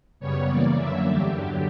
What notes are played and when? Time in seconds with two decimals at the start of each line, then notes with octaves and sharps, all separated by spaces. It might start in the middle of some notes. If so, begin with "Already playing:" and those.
0.20 F#2 C#3 G3 B3 C#5
0.48 C#3 E3 A#3 D5
0.77 F#2 D3 F#3 A#3 E5
1.05 E2 D3 G3 G4
1.34 G2 D3 F#3 G4